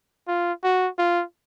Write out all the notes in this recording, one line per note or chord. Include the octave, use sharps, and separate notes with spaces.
F4
F#4
F4